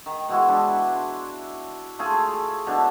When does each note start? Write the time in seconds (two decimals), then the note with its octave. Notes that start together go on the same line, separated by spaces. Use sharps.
0.06 D#3
0.29 B2 G#3 E4 F#4
0.48 D4 B4 B5
0.89 C6
1.99 A3 F4 G#4 A4
2.67 B2 D4 E4 A5